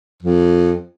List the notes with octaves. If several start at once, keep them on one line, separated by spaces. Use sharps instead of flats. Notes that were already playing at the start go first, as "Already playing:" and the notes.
F2